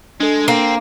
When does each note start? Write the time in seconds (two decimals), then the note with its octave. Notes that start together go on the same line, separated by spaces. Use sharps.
0.20 G#3 D4 A4
0.48 A#3 C4